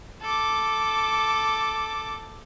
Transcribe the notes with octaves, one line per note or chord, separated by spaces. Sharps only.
A4 D6